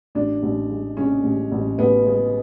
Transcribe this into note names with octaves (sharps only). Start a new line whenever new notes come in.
A1 D4
A1
G#3
G#3 C#4
A1
A1
A1 B3
G#3